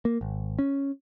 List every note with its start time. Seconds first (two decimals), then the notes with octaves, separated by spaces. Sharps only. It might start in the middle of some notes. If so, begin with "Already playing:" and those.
0.05 A#3
0.21 G#1
0.59 C#4